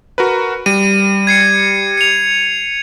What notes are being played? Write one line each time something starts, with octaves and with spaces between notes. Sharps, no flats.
F#4 A#4 B4
G3 D#7
G#6 C7 C#7
C#7 F7